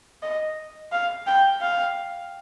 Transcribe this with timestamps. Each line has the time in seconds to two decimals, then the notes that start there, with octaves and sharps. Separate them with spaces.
0.23 D#5
0.92 F5
1.27 G5
1.62 F5